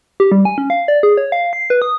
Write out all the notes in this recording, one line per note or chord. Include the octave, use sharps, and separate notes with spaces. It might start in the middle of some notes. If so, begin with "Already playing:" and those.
G4
G3
G#5
C#4
F5
D5
G#4
C#5
F5
C7
B4
D#6